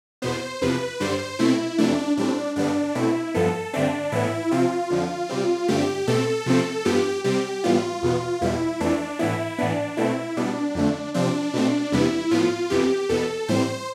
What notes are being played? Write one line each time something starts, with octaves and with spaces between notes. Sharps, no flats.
E2 B2 B3 C5
E2 C3 F3 B4
G2 D3 G3 C5
B2 A3 C4 E4
F2 C3 E3 A3 D4
A2 G3 C4 D4
G2 D3 G3 B3 D4
B2 A3 C4 E4
G2 F3 B3 A4
G2 D3 A3 C4 D4
A2 E3 B3 E4
C3 F3 C4 F4
F2 D3 F3
C3 G3 C4
G2 D3 A3 C4 G4
B2 A3 C4 A4
C3 F3 A3 C4
G2 F3 B3 G4
C3 G3 C4 G4
A2 E3 G3 B3 F4
E2 B2 B3
E2 B2 G3 E4
F2 E3 A3 D4
A2 E3 B3 E4
A2 E3 B3 D4
B2 A3 C4 E4
B2 G3 B3 D4
F2 D3 A3
C3 F3 C4 D4
B2 A3 C4
E2 C3 G3 B3 E4
A2 F3 B3 F4
F2 C3 E3 B3 G4
E2 B2 B3 A4
A2 E3 G3 C4 C5